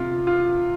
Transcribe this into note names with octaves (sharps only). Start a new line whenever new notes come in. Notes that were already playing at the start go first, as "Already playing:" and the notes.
Already playing: C3 F4
F4